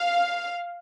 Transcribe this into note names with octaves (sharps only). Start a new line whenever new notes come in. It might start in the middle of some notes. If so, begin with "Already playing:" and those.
Already playing: F5